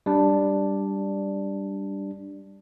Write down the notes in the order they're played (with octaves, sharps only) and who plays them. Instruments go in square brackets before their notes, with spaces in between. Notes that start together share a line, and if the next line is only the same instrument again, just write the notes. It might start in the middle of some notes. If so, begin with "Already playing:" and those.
[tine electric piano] G3 D4